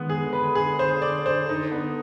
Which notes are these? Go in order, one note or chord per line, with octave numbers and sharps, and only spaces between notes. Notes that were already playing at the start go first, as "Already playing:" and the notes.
Already playing: D#3 G#3 B3
G#4
D3
B4
G#4
C5
D5
C5
D#4
B3